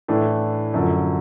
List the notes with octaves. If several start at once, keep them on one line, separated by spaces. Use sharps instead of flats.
A2 E3 A3 D4
F#2 D3 F3